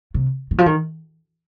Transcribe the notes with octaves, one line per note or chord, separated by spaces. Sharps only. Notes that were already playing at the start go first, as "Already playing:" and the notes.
C3
D#3
F3
D#3